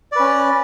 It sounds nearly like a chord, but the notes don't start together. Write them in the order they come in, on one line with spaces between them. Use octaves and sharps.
D5 B4 C#4